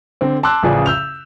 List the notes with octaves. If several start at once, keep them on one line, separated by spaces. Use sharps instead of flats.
D3 C4
A5 C6 D6 E6 F#6
A1 C#3 F3 G#4 D5
E6 G6 F7